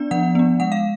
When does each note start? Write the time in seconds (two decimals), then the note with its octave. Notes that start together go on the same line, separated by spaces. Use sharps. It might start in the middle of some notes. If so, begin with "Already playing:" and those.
Already playing: B3 D4 D5
0.11 F3 F#5
0.35 B3 D4
0.60 G#3 F#5
0.72 F5